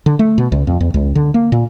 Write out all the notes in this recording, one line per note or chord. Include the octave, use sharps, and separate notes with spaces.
D3
A3
B2
C#2
F2
E2
C#2
D3
A#3
A#2